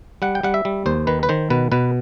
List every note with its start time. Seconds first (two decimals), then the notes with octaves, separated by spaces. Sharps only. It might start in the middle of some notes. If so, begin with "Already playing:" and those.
0.22 G3 F#5
0.35 G5
0.43 G3 F#5
0.54 E5
0.65 G3
0.86 D#2 C5
1.07 D#3 B4
1.23 B4
1.29 D#3 C5
1.50 B2 B4
1.72 B2 B4